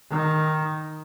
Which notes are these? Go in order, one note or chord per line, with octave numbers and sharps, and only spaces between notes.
D#3